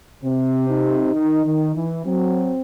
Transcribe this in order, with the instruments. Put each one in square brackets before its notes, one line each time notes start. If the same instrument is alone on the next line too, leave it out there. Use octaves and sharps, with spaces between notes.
[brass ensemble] C3 [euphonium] C4
[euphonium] D#4
[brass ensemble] D#3
D#3
E3
[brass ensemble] F#3 [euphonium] C4